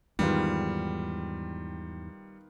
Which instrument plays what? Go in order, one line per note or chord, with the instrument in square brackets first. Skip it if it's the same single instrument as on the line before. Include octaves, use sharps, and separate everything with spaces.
[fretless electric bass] E2 G#2 [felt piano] D#3 B3 F4 [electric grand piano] G3